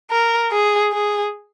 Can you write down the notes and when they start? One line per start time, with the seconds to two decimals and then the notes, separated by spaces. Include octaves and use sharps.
0.11 A#4
0.52 G#4
0.93 G#4